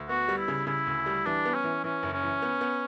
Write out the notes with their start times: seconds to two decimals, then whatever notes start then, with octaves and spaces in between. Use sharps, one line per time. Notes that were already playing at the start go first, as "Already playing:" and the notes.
Already playing: D2
0.09 B3 F#4
0.28 G3
0.38 E4
0.48 C#3
0.67 C#3 E4
0.87 D2
1.06 G3
1.25 E3 D4
1.45 B3
1.54 C#4
1.64 E3
1.84 E3 C#4
2.03 F#1
2.13 C#4
2.23 E3
2.42 B3
2.61 B3